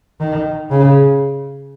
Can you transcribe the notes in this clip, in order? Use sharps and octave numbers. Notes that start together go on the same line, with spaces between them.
D#3
C#3